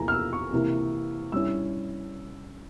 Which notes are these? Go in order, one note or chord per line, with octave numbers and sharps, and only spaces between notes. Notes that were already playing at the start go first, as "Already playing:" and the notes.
Already playing: E2 C3 F3 A#3 E4 G#5 A#5
F6
E6
C#6
C3 E3 A#3 E4
G2 G3 C#4 E4 E6